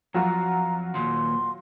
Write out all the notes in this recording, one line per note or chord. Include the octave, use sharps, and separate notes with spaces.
F2 F#3 F4 F#4 A#5
D#2 A#2 C6